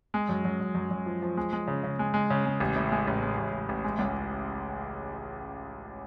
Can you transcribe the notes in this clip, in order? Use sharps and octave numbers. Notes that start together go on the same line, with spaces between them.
G#3
F#2
F#2
F#2
F#2
F#2
F3
F3
G#3
G#3
C#3
C#3
G#3
G#3
C#3
G#3
A1
A2
G#3
A1
G#3
A1
A1
A1
G#3
C#2